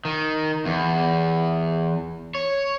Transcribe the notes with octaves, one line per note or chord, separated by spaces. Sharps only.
D#3
E2
C#5